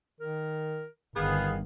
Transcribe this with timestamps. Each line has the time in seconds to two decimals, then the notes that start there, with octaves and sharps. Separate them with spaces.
0.20 D#3 A#4
1.16 G1 D#3 B3 G#4 F5